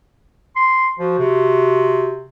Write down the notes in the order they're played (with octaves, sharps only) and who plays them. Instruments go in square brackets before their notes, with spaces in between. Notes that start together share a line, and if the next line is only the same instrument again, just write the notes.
[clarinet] C6
[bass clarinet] F3 [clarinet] F#4
[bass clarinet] C3